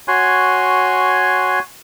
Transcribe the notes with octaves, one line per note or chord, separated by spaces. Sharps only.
F#4 C#5 G#5 C6 F#6